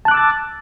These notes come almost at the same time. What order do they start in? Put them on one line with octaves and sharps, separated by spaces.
A5 F#6 D6 E6 A6